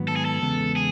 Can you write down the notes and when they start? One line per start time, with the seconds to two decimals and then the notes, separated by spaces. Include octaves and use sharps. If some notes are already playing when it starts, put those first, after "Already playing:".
Already playing: G#2 D#3 F#3 B3
0.08 A4
0.16 G#4
0.25 A4
0.42 E2 C#3 G#3 B3
0.76 G#4